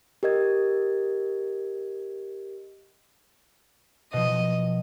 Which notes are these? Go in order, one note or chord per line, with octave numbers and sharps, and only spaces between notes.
G4 A#4 D#5 G#6
B2 F3 D#5